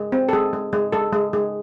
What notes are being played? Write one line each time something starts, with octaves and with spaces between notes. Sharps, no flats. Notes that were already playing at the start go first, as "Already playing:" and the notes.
Already playing: G#3
C4
A4
G#3 G#4
G#3
G#3
G#3 A4
G#3
G#3